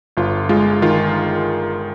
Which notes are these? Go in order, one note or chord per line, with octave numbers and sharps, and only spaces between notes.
G1 F4
G#3 F4
D#3 F4